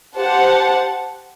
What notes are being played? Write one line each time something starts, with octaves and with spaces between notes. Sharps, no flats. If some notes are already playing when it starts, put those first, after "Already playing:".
G4 C5 F#5 A5